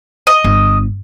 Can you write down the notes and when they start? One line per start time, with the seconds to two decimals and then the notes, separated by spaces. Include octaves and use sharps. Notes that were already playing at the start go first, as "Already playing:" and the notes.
0.27 D#5
0.44 G1